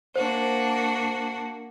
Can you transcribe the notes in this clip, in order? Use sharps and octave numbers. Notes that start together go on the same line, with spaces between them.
A#3 D4 F#4 C5